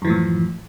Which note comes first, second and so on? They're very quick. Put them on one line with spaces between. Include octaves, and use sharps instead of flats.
F#2 E3 F3 A2